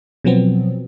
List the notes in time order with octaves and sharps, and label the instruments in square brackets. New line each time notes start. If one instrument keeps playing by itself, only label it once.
[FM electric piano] B2 F3 F#3 B3 C4